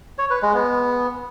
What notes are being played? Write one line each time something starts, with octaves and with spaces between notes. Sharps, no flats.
C#5
B4
G#3
B3